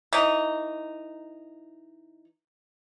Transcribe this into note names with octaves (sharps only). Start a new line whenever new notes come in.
E3 D#4